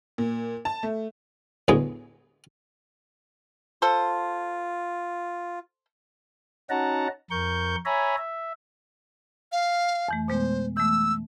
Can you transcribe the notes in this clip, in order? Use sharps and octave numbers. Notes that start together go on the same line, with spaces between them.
A#2
A5
A3
D2 A2 G#3 B3 G#4
F4 A4 C5
C#4 D#4 F#4 F#5 A5 A#5
F2 A#4 C#6 G6
C#5 E5 G#5 A#5 B5
E5
F5
F2 E3 A3
B2 G#3 B3 C5
E3 A3 E6